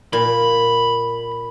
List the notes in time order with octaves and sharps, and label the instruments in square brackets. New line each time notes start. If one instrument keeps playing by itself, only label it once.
[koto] A#2 [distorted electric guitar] B5